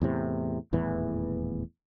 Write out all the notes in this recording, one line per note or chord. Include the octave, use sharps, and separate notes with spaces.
E2 A2 C3
D#1 E2 A2 E3